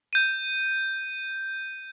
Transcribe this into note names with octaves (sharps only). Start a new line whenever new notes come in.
G6 D#7